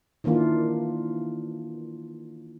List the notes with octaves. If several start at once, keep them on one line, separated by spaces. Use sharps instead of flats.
D#3 E3 A#3 D4 F4